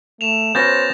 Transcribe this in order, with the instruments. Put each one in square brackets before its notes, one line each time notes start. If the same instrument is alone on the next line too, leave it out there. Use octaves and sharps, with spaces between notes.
[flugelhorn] A3 [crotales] E7 F7
[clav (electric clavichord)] B3 C#4 F#4 [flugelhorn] C5 [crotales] G6 A6 A#6